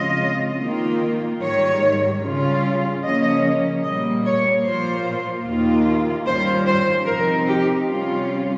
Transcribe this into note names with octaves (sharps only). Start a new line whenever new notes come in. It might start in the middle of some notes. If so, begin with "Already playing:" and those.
Already playing: C#3 F3 G#3 C4 F4 D#5
D#3 A#3 F4
G#2 D#3 G3 C#5
C#3 G3 C#4 F4
C#3 F3 A#3 C#4 D#5
A#2 G3 A#3 D#5
C#5
A#2 F3 A#3 F4 C5
D#2 D#3 A#3 F4
D#3 G3 C#4 F4 C5
C5
C3 F3 C4 D#4 A#4
G4
C3 G3 C#4 F4